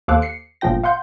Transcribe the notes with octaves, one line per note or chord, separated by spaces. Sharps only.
D#2 A4 C5 F5 D6 F#6
C7 C#7
G1 A#2 F3 F4 G5 A#6
F5 F#5 C6 G6